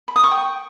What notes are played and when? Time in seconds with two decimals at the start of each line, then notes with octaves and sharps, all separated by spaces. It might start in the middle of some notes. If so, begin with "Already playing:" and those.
0.08 B5
0.16 D#6
0.24 C#6
0.31 G5